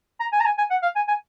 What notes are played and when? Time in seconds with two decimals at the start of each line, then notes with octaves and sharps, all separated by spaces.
0.20 A#5
0.32 G#5
0.40 A#5
0.45 G#5
0.58 G#5
0.70 F#5
0.82 F5
0.96 G#5
1.08 G#5